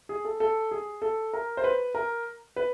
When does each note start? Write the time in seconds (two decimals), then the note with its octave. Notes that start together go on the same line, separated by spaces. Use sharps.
0.09 G#4
0.25 A4
0.40 A4
0.71 G#4
1.02 A4
1.33 A#4
1.57 C5
1.64 B4
1.95 A#4
2.56 B4